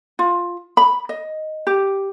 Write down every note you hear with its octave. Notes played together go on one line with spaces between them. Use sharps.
F4
B5
D#5
G4